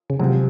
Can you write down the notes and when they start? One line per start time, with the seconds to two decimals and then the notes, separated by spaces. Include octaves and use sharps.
0.10 C#3
0.20 F#2 C3 F3 G#3 C4